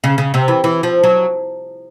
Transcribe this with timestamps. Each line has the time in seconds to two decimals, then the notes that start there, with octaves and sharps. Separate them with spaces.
0.04 C#3
0.18 C#3
0.34 C3
0.48 E3
0.64 E3
0.83 F3
1.03 F#3